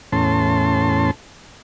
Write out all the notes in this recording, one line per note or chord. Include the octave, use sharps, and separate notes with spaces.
E2 A2 C#4 A5 C6